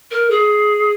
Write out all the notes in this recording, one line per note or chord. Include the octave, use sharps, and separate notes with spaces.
A#4
G#4